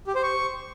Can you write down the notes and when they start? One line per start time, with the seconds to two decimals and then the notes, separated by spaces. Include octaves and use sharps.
0.07 G4
0.15 C5
0.23 C#6